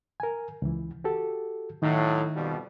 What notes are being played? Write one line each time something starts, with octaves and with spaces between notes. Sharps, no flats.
A#4 G#5
C#2 E3
F#4 G4 A4
A2 D#3 F#3 D#4
F2 B2 G3